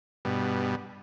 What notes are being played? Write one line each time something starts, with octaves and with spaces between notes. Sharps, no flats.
G2 B2